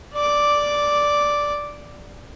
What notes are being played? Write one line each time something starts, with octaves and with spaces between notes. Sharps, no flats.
D5 D6